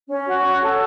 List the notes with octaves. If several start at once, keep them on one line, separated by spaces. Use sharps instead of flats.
C#4
F#4
C#5
A4